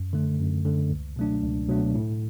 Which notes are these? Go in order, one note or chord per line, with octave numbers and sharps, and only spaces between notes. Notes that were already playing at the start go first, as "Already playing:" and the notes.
Already playing: F#2
D3 A3
F#2
D3 A3
C#2
B2 F#3 A3 D4
C#2
B2 F#3 A3 D4
A2